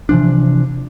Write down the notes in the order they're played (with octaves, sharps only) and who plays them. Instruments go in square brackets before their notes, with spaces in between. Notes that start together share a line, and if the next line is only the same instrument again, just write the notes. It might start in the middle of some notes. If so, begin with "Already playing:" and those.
[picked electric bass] C3 E3 F3 D4